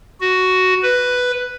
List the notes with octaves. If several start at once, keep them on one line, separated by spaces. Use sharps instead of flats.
F#4
B4